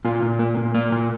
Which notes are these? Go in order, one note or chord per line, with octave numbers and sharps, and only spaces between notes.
A#2 F4
A#2
A#3
A#2
A#3
A#2